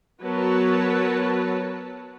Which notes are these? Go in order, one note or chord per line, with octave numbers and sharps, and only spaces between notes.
F#3 B3 A#4 B4 C#5 A5